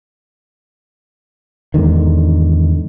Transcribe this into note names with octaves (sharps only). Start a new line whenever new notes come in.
E2 G#2 D3 D#3